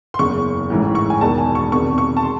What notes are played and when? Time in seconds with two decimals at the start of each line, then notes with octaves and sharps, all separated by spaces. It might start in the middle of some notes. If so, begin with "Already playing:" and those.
0.14 C6
0.19 F#1 E2 C#3 C#6
0.70 A1 G#2 E3
0.95 C#6
1.10 G#5
1.21 E1 E2 D#3 A5
1.38 G#5
1.55 C#6
1.72 E1 E2 C3 D#3 C#6
1.98 C#6
2.17 A5
2.23 C6